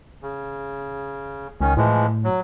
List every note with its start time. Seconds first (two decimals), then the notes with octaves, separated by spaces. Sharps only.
0.22 C#3
1.61 C#2 D#3 C#4
1.77 A2 E3 F3 G#3
2.24 F#3